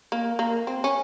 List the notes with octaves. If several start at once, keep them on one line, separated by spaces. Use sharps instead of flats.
A#3
A#3
C4
C#4